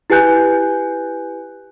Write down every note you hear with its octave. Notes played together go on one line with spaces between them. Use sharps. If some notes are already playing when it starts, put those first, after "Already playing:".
E4 G4 B4 G#5 F#6 G6